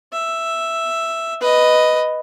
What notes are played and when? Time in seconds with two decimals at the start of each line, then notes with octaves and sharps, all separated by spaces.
0.13 E5
1.41 B4 D#5